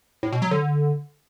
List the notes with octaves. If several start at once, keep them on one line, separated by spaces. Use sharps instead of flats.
A2
B2
F#3
D3